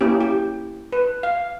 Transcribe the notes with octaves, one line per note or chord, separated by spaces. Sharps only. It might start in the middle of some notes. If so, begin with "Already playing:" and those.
A#3 C#4 E4 G4
G4
B4
F5